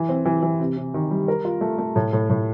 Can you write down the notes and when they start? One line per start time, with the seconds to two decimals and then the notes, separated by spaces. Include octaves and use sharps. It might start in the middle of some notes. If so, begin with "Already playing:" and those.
Already playing: E3
0.09 C4
0.25 E3
0.42 E3
0.60 C3
0.77 C3
0.94 D#3
1.10 G3
1.28 A#4
1.45 F4
1.61 A3
1.78 A3
1.96 A2
2.13 A2
2.30 A2